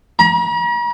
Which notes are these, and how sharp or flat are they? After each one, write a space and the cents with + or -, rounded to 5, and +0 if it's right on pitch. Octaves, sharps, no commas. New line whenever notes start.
A#5 +45